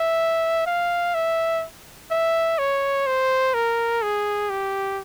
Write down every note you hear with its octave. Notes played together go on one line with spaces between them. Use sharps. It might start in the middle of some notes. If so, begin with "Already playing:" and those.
Already playing: E5
F5
E5
E5
C#5
C5
A#4
G#4
G4